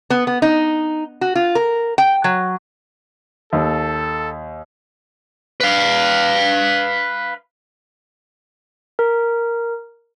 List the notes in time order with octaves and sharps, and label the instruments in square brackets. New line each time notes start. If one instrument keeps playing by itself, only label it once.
[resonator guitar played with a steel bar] B3
B3
D#4
F#4
F4
A#4
G5
F#3
[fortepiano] D#2 [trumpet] A4
[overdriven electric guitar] B4 F5
[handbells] A#4